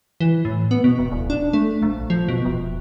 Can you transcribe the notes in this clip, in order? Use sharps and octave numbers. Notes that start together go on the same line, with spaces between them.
E3
A2
B3
B2
E1
D1
D4
A3
A#1
F3
B2
E1